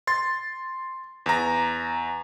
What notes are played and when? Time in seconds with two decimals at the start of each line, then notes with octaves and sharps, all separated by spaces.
0.07 C6 A6
1.26 E2 A#5